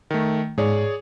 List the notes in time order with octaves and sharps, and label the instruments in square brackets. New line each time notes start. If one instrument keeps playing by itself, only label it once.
[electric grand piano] D#3 A3
[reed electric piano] G#2 [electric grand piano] G#4 C#5 D5